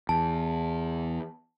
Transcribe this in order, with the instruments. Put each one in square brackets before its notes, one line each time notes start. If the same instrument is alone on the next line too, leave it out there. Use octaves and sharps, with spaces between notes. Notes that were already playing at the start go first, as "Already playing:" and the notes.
[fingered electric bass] E2 [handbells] A5